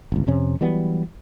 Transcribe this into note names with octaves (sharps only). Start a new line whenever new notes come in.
G1 C#2
F2 C3 C#4
E3 F#3 G3 B3